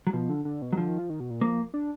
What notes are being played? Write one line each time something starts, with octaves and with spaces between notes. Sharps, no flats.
F#3
B2 F3
D3
D3
B2
F#3
D3 F3
D#3
F3
D#3
B2
A#2
F3 A#3
D4